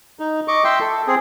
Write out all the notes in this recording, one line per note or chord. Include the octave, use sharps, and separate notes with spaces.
D#4
D#5 C#6 D6
E5 G5 C6
A4
C4 G#4